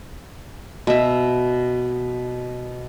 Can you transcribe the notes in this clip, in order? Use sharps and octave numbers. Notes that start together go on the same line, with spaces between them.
B2 E5